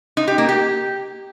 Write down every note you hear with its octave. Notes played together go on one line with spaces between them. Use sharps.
D#4
G4
A#3
G4